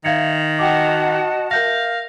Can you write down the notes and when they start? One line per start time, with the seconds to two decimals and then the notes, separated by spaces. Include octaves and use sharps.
0.05 D#3 E5 F5 G#6 C#7
0.59 F#4 D#5 F#5 G5 A5 D6
1.51 A#4 E5 F5 G6 A#6